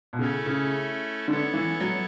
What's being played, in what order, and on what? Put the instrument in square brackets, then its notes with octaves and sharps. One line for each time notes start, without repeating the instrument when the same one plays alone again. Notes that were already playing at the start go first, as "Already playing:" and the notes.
[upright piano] B2
[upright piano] C#3 [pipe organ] A3 C#4 E4 A4
[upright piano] C#3
[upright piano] D3 [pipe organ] B3 E4 A4 C#5
[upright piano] E3
F#3